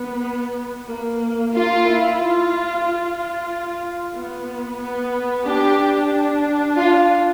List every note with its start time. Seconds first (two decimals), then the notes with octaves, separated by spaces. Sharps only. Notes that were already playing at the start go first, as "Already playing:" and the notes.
Already playing: B3
0.87 A#3
1.53 A#3 F4
1.85 E4
2.18 F4
2.84 F4
4.15 B3
4.80 B3
5.45 D4 G4
6.77 F4